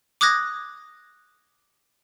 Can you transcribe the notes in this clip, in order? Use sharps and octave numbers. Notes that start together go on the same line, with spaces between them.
D6 D#6 F#6 G#6 A#6